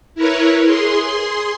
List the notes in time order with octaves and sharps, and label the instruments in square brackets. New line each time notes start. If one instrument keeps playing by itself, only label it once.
[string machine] E4 A#4 B4 C#5
G#4 C6